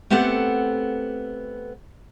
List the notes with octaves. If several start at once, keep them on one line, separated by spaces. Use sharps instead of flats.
A3 B3 C4 G4 A4 F#5